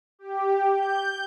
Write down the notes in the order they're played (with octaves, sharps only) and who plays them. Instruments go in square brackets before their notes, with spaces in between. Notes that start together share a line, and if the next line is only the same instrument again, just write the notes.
[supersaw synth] G4
G6